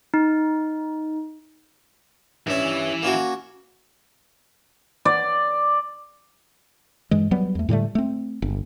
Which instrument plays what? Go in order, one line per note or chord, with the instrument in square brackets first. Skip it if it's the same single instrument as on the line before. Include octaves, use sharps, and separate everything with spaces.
[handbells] D#4
[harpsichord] G2 C#4 [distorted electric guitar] E3 E5
[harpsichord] A#3 C#4 F#4
[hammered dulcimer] D5
[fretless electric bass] G2 E3 G#3
F#3 G3 B3
E2 A3
A2 D3 G3 A3
A3 C4
G1